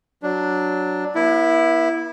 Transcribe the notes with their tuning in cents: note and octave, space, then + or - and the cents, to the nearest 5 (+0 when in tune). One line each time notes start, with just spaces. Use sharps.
F#3 +0 D4 +0
B3 -45 E4 +0